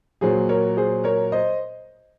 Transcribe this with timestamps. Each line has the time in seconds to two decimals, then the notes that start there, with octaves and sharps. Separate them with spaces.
0.21 A#2 F#3 G#4 C5
0.49 A#4 C#5
0.77 G#4 C5
1.04 A#4 C#5
1.32 C5 D#5